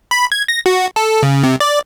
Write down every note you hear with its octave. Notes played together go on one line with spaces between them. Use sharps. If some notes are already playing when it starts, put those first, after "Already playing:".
B5
G#6
A#6
F#4
A4
C#3
C3
D5